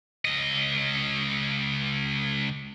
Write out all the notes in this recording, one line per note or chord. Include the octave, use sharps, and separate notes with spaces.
C#2 D#5